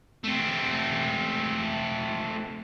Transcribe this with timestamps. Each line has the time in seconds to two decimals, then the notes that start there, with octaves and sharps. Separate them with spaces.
0.24 A3 C4